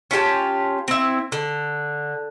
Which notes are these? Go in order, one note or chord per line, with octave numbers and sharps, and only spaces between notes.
C#4 F4 G4 A5
C4 E4
D3